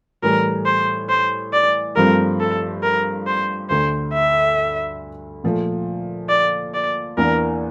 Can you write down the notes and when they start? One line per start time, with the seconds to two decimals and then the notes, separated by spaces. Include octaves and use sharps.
0.22 A2 E3 G3 A#4
0.66 C5
1.10 C5
1.53 D5
1.96 G2 F3 A3 C4 A#4
2.40 A4
2.83 A#4
3.27 C5
3.70 D2 D3 A3 C5
4.14 E5
5.44 A#2 F3 A3
6.30 D5
6.74 D5
7.17 E2 E3 A#3 D4 A#4